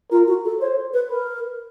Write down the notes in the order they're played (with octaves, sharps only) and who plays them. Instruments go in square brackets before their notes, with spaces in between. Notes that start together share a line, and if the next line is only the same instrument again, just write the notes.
[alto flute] F4 [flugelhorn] A#4
[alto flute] F#4
A4
[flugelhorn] C5 [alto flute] C#5
[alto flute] B4
[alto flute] A#4 [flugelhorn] B4